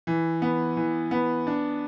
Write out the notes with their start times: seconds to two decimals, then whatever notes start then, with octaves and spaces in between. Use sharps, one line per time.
0.07 E3
0.42 B3
0.77 E3
1.11 B3
1.47 D4